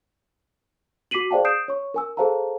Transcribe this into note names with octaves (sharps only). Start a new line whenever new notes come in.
F#4 D6 B6 C7 D#7 F#7
G#4 C5 D5 F5 G5 A5
D#6 G6 C7 D7 E7
C#5 C#6
A#4 G#5 E6
G#4 A4 C5 F5 A5 A#5